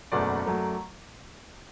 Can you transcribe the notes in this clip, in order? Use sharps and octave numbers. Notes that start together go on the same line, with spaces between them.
F#1 E2 B2 F#3 A3 D5 F#5
F#2 F#3 A3